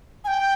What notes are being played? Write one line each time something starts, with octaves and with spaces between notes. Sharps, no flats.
G#5
G5